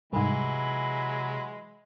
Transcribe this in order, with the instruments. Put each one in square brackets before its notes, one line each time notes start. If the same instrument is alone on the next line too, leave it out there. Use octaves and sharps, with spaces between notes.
[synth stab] C2 G#2 [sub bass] C3 [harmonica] E3 F#3 G#3 [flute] B5